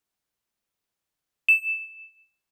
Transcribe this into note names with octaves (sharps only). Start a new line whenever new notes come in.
E7